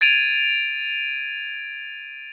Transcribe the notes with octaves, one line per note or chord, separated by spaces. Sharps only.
G#6 A6 D7 D#7 F7